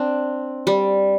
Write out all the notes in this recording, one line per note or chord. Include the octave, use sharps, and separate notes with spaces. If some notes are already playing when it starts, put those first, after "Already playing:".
Already playing: C4 D4
G3